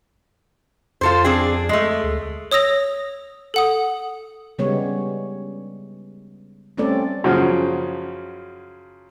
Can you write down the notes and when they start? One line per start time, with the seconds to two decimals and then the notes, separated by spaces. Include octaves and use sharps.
1.01 F2 F4 A4 C5
1.24 C4 D4 G#4
1.69 G#3 A3
2.04 D2
2.51 C#5 D#6 E6 A#6 F7
3.54 A4 F#5 D#6
4.59 C#3 G3 G#3 B3 C#5
6.77 G3 A3 C4 C#4 A4 D5
7.24 F#2 C#3 F3